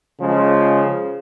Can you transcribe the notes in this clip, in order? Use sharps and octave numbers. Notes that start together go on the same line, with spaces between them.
C#3 F3 G#3